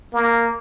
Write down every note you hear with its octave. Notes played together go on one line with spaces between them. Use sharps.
A#3